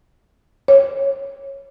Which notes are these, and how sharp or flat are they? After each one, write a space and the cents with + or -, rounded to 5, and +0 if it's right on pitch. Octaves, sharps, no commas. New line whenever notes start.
C#5 -15